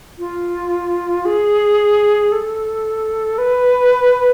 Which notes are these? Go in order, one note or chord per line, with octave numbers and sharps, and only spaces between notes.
F4
G#4
A4
B4